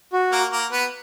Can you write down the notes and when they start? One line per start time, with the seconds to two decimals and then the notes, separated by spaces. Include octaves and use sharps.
0.13 F#4
0.32 A#3 A#4
0.52 A#3 A#4
0.71 B3 B4